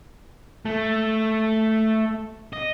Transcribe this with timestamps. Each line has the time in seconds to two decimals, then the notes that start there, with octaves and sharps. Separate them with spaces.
0.65 A3
2.53 D#5